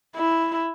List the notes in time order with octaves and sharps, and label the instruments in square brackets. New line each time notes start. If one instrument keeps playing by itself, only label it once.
[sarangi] E4